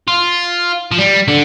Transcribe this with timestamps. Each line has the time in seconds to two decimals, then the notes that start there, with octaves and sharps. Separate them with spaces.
0.08 F4
0.91 F3
0.98 G3
1.28 D3